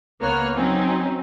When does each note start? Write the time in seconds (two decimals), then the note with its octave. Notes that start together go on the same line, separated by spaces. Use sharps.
0.20 C#2 A#3 B3 C#5 F6 F#6
0.55 F#3 C4 C#4 D#4